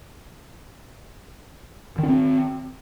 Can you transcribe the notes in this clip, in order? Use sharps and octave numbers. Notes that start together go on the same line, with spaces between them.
D#3 C4 D4